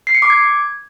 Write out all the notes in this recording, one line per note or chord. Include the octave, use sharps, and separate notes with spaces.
C7
C#7
D6
G#6